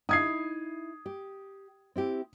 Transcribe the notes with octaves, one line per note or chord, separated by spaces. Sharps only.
D#4 E4 D#6 G#6 C7
G4
C4 E4 G4